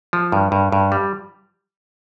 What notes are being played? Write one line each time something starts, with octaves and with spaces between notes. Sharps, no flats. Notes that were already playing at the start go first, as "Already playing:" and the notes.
F3
G2
G2
G2
G3